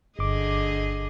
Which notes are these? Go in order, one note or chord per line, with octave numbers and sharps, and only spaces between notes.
G1 D3 G#4 D#5 D6